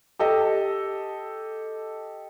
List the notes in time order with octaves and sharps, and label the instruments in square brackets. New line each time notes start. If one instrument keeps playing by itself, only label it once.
[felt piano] G4 A4 D#5